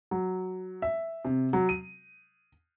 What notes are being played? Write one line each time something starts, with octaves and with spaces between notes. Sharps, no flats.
F#3
E5
C3
F#3
D#7